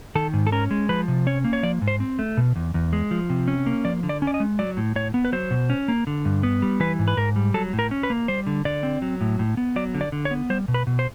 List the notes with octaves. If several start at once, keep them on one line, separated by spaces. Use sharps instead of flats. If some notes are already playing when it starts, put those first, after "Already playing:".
D#3 A4
G#2
A4
C#4 A#4
G#3
F3 B4
C3
C#4 C#5
A#3
C#5
F3 D5
G#2
C5
C4
A3
B2
E2
E2
G#3
F3
C3
C#4
A#3
F3 D5
D3
D5
C#4
D5
D#5
G#3
F#3 D5
A2
A2 C#5
B3
B4
F#3 C5
B2
C#4
A#3
D3
G2
B3
G3
E3 B4
G#2
B4
G#2 A#4
G3
F#3 A4
A2
A#4
C#4
B4
A#3
G3 C5
D3
D3 D5
C4
F#3
A2
A2
B3
F#3 D5
D3
D5
D3
C#5
B3
G3 C5
B2
B4
B2
C5